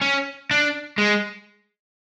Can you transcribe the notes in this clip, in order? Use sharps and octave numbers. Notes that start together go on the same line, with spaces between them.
C#4
D4
G#3